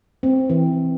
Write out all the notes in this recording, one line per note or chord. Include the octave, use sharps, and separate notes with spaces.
C4
E3